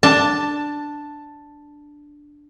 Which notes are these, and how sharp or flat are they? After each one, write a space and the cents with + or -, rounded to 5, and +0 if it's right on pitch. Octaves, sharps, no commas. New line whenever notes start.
D4 +0 A5 +15